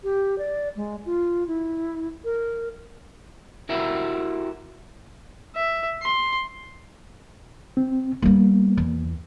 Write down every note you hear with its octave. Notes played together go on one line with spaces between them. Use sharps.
G4
D5
G#3
F4
E4
A#4
E4 F#4 G4 A#4 E5
E5
C6
C4
G3 A#3 B3
E2